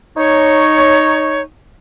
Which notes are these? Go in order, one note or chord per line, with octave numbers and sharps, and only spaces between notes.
D#4 C#5